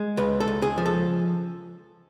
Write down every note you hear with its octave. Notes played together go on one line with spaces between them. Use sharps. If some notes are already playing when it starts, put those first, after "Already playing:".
Already playing: G#3
C#2 B4
A4
C#2
G#4
F3
A4